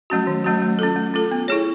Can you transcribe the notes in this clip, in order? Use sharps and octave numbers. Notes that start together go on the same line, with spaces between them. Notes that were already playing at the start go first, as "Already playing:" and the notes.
F#3 A3 C#4 F#4
D#3
F#3 A3 C#4 F#4
A3
C#4 F4 A4
A3
C#4 F4 A4
B3
E4 G#4 C#5